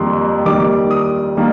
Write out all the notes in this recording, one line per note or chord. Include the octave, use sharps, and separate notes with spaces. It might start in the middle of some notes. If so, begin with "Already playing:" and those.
Already playing: F2 D#3 G3 A#3 C6
D#2 D#3 G3 D6
D#6
D#3 G3 A#3